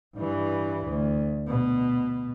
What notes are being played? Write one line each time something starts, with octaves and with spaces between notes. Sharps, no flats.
G2 E3
D2
B2